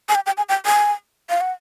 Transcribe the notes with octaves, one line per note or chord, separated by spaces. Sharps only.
G#5
G5
G5
G#5
G5
G#5
F5
F#5